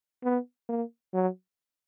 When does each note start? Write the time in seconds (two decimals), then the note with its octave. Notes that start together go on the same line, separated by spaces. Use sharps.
0.24 B3
0.69 A#3
1.14 F#3